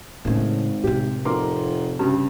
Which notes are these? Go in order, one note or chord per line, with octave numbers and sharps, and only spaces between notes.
G#1 A2 C#3
A2 C3 G4
F1 A#4 C6 D6
G2 C#3